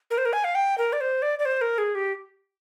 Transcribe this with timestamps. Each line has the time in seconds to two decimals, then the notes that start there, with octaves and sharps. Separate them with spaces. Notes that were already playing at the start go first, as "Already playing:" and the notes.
0.11 A#4
0.18 C5
0.25 A#4
0.33 G#5
0.44 F5
0.55 G5
0.78 A#4
0.93 D5
1.01 C5
1.22 D5
1.39 D5
1.45 C5
1.61 A#4
1.78 G#4
1.95 G4